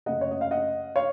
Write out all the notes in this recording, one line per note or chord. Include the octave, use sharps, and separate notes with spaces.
F#2 C#3 A3 D#5 F#5
C#5
D#5
F5
D#5 F#5
C#5 F5